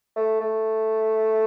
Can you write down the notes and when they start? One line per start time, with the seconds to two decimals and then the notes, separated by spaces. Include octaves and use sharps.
0.16 A3
0.40 A3